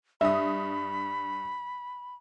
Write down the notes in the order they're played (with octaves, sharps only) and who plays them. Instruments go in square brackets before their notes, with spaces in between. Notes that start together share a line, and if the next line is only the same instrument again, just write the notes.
[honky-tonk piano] G2 D#6 [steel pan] E5 [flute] B5